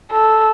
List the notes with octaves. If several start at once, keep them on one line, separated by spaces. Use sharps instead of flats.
A4